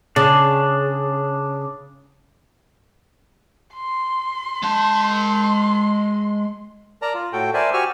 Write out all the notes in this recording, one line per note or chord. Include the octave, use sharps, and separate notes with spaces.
C#3 D4
C6
G#3 A5
A#4 D5 A5 A#5
F4
A2 F#4 A4 G5
A#4 C5 D5 E5 G#5 A5
F#4 G4 G#5 C#6 E6 F6